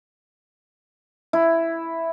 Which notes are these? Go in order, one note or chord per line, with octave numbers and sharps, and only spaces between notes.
E4